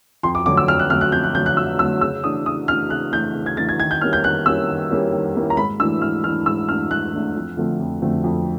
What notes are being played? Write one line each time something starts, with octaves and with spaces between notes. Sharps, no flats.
F2 C6
D6
D3 F#3 A3 D6
E6
F2 F6
F#6
D3 F#3 A3 F6
F#6
F2 G6
F#6
D3 F#3 A3 G6
F#6
F2 E6
D3 F#3 A3 E6
C#3 E6
E3 A3 D4 D#6
C#3 D#6
E3 A3 D4 F6
C#3 F#6
E3 A3 D4 G6
C#3
G#6
E3 A3 D4 A6
G#6
D#3 G#6
G6
G3 A#3 C#4 E4 F6
G6
D#3 F#6
G3 A#3 C#4 E4 E6
D#3
G3 A#3 C#4 E4
D#3
G3 A#3 C#4 E4
A#5
G#2 B5
E3 A3 D4 E6
G#2 F6
E3 A3 D4 F6
G#2 E6
E3 A3 D4 F6
G#2 F#6
E3 A3 D4
F2
D3 F3 A3 C4
F2
D3 F3 A3 C4
F2